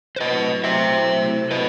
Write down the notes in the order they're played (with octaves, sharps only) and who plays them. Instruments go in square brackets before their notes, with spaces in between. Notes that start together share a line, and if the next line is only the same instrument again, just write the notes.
[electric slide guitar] C5
[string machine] C3 F#3 A3 E4 [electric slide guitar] B4 D#5
[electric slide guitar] C5 E5
B4 D#5